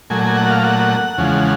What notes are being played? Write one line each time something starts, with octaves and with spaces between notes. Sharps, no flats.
A#2 F#3 A3 G#5
G#5
F#5
F5
F#5
E2 C#3 F3 G#3